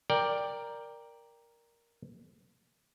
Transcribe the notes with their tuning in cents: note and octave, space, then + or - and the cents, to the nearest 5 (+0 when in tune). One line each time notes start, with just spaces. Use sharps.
A#4 +0 D5 +0 G5 +10